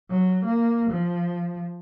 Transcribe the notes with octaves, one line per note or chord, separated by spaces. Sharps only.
F#3
A#3
F3